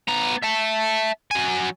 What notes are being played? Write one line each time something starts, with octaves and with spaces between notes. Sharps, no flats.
B3 A#5
E5 A5
F#3 G#5